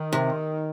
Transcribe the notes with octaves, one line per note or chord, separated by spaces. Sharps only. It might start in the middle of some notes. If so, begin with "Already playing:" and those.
Already playing: D#3
C3